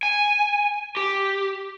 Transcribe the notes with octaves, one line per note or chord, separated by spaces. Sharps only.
G#5
G4